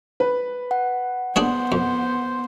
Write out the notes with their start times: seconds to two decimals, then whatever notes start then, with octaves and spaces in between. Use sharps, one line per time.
0.20 B4
0.71 F#5
1.36 B3 D4 G#4 C5 C#5
1.72 F2